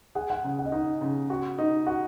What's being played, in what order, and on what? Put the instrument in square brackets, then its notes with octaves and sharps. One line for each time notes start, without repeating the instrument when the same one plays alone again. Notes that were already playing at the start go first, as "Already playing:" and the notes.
[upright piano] G#4 [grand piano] F#5
[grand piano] F#5
[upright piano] C#3
[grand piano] F#5
D#5
[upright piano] D#4 [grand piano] F#5
[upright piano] C#3
F#4
D#4
[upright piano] F#4 [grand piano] F#5